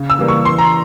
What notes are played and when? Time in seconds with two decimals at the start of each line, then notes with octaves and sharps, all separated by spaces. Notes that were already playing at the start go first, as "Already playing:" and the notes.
Already playing: C#3
0.10 E6
0.19 E3 G3 A#3
0.28 C#6
0.45 E3 C6
0.58 A#5